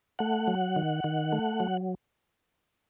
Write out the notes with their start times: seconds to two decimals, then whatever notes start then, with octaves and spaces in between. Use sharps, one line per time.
0.19 A3 F#5
0.48 F#3
0.76 D#3
1.04 D#3
1.32 A3
1.60 F#3